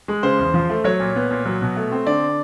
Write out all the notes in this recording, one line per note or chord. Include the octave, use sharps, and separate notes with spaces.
G#3
C#3 C5
E2
F3
A3
F#3 C#5
A#2
B3
A#2
F#3
B2
A3
C4
D3 D5